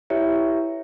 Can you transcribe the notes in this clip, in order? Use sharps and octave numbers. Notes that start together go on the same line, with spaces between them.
E4 G4 B4 C#5 E5